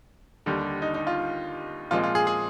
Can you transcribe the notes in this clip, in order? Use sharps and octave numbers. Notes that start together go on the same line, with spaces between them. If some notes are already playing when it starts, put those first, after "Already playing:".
D#2 D3 G3
D#4
D#4
F4
A#2 F3 G#3 C4 F4
F4
G#4
G#4